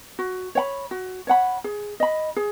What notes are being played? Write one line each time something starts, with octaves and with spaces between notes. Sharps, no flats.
F#4
C#5 F#5 B5
F#4
C#5 F#5 B5
G#4
D#5 B5
G#4